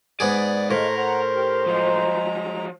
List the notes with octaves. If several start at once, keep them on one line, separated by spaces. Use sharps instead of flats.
G#2 B3 G#4 D5
A2 G#3 A#4 C5 F5
C5 F#5 A#5
G4
F3 F#3 G#3 A#5